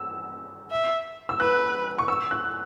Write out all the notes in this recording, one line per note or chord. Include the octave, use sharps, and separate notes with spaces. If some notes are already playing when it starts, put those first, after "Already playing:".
Already playing: E6
E5
E6
B4 F#6
C#6
E6
F#6